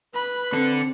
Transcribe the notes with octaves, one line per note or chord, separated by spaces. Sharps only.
B4 B5
C4 D4 A4 C#7